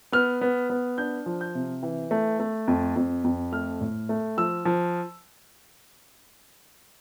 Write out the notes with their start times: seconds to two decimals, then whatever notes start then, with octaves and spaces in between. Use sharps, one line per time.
0.12 B3 F6
0.41 B3
0.70 B3
0.98 D4 G6
1.26 F3
1.41 G6
1.55 C3
1.83 E3
2.11 A3
2.40 A3
2.68 F2
2.96 F2
3.24 F2
3.52 A3 F6
3.81 A2
4.09 A3
4.37 F3 E6
4.65 F3